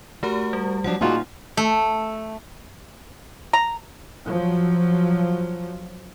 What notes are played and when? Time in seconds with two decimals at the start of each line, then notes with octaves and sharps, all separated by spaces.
0.23 A3 F#4 G4 A#4
0.53 G3
0.84 F3 F#3 D4 F#5
1.01 A#2 D4 D#4 F4 F#4 G#4
1.57 A3
3.53 A#5
4.25 F3 F#3